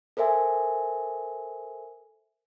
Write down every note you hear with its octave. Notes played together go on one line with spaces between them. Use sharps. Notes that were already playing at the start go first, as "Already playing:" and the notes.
A4 A#4 C5 E5 G#5